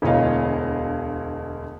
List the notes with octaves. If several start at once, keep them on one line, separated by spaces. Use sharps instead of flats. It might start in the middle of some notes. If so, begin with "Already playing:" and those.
E1 D2 E4 C#5 D#5 F5